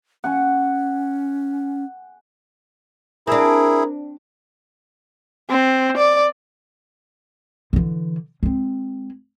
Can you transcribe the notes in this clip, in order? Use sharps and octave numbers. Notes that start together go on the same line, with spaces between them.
C#4 F#5 G#5 C#6
C4 D4 E4 G#4 A#4
C4
D5
D3 E3
G#3 C4